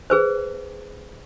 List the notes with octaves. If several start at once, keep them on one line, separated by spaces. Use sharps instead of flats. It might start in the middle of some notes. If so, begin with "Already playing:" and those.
G#4 B4 C5